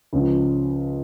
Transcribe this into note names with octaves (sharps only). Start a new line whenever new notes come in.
C#2 C#3 F3